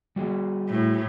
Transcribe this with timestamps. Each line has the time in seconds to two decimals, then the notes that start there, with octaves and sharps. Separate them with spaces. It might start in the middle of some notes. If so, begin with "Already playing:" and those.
0.16 G3 F#4 G#4
0.67 A2